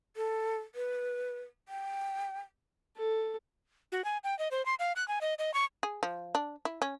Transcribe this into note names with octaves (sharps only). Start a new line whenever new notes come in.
A4
B4
G5
A4
F#4
G#5
G5
D#5
C5
C6
F5
F#6
G#5
D#5
D#5
C#6
G#4
F3
D4
E4
C#4